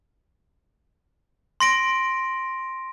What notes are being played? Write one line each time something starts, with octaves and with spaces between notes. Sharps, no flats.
C6 A#6 D7